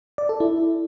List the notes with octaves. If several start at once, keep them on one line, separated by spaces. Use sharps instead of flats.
D5
A4
E4